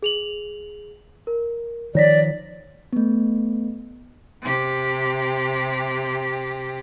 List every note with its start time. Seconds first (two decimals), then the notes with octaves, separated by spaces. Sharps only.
0.02 G#4 F7 F#7
1.27 A#4
1.95 D#3 F3 C#5 D5 A#6 B6
2.93 A3 B3
4.42 C3 G4